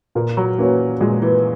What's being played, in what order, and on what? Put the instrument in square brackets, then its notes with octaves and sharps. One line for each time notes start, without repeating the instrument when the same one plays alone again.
[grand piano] A#2 [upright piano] A#3
[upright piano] F#3
[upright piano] E3 [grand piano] A#3 C#4 F#4 C#5
[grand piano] A#2 [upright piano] G#3
[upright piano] E3